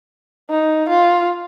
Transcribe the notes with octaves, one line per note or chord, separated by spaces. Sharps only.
D#4
F4